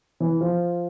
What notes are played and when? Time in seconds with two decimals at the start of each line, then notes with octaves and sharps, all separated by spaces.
0.20 E3
0.41 F3